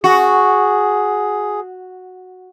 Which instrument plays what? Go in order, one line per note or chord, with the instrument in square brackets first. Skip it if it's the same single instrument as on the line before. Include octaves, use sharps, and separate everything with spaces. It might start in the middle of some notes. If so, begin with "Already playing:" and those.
[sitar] F#4 [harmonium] G#4